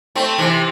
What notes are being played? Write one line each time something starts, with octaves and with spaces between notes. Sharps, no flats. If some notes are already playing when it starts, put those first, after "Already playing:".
A3 C4
C3 E3